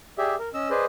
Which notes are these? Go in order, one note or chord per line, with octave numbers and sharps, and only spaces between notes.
G4 G#4 D5 E5
A#4
C#4 D#5 E6
G#4 B4 C5 D5 D#5